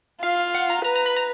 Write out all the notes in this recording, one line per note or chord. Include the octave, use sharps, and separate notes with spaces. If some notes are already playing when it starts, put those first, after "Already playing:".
F4 F5
F#5
A#5
B4 A#5
A#5
B5
A#5